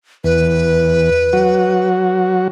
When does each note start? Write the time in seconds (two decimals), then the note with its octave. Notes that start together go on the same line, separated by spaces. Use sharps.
0.24 E2 B4
1.33 F#3 F#4